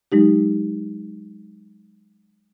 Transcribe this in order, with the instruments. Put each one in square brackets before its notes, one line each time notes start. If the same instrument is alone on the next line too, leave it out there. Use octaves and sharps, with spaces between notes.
[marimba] F#3 G#3 D#4 G4